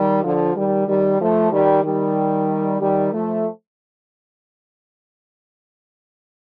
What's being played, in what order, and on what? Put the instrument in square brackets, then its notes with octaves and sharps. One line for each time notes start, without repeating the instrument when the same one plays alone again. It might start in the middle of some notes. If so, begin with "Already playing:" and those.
Already playing: [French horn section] D#3 G3
D3 F3
D#3 G3
D#3 G3
F3 A3
D#3 G3
D#3 G3
D#3 G3
F3 A3